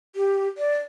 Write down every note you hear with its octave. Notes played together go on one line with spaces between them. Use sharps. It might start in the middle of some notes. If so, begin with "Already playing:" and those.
G4
D5